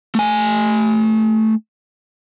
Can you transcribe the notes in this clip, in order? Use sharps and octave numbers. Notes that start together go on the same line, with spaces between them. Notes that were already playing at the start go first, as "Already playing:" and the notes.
A3 G#5